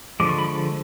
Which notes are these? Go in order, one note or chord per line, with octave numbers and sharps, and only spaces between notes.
D3 F3 G#3 D6
C#6
B5
C#6